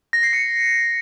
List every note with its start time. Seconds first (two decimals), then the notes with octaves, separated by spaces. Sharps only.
0.13 A#6
0.23 C7
0.33 C#7